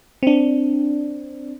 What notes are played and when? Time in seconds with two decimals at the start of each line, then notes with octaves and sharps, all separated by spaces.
0.23 C4 D4